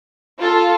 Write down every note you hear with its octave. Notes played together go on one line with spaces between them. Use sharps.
F4 A4